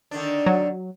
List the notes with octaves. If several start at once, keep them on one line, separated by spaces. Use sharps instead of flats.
D3 D#3 D4
F#3